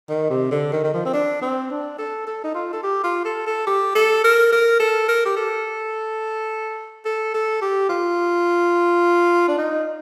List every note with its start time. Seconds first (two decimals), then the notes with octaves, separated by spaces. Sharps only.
0.09 D#3
0.30 C3
0.51 D3
0.73 D#3
0.84 D#3
0.94 F3
1.06 C4
1.14 D4
1.42 C4
1.71 D4
1.98 A4
2.27 A4
2.44 D#4
2.55 F4
2.73 A4
2.83 G4
3.04 F4
3.25 A4
3.47 A4
3.67 G4
3.95 A4
4.24 A#4
4.52 A#4
4.80 A4
5.09 A#4
5.25 G4
5.37 A4
7.05 A4
7.34 A4
7.62 G4
7.89 F4
9.48 D4
9.58 D#4